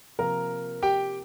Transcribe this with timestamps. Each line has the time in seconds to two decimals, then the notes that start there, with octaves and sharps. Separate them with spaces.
0.19 C3 F3 A#3 A#4 A#5
0.83 G4 G5